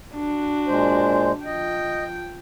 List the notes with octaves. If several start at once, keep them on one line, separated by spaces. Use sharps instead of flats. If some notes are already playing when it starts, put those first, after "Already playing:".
D4 F#4
A#2 G#3 C5
F3 D#5 G5